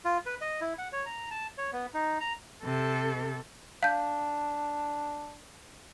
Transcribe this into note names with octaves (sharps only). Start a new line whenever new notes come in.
F4
B4
D#5
E4
F#5
C#5
A#5
A5
C#5
B3
D#4
A#5
C3 A4
D4 F5 G6